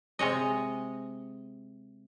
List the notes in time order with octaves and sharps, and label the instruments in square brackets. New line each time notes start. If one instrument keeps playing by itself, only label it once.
[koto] C3 G#3 C#5 D#5